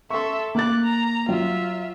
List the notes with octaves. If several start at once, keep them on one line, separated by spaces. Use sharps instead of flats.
A4 E5 C6 C#6
A#3 D6 F#6 A6
A#5
F#3 F4 E5